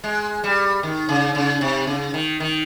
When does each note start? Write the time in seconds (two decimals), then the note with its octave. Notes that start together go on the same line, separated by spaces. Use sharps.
0.04 G#3
0.44 G3
0.83 D#3
1.09 C#3
1.35 C#3
1.61 C3
1.87 C#3
2.14 D#3
2.40 D#3